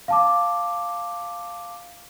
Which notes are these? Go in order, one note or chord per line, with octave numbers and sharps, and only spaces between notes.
F5 A5 D6